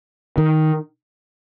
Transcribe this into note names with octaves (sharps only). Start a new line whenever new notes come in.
D#3